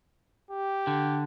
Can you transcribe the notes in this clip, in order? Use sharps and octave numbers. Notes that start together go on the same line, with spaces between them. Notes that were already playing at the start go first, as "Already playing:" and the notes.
G4
D3